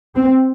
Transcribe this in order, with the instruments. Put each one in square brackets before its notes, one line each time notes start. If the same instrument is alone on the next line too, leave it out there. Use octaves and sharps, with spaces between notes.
[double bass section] C4